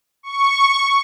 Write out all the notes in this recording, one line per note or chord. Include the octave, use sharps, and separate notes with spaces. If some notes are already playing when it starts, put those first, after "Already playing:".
C#6